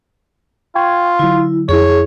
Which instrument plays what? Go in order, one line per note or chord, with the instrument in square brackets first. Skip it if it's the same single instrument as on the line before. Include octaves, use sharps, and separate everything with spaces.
[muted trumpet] F4 [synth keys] G5 C#6 G#6
[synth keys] D3 F#3 [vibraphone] E4
[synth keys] F2 E4 [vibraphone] G#4 [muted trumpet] C#5